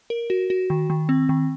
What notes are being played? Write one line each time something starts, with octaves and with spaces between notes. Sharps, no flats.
A#4
F#4
F#4
D#3
D#3
C4
D#3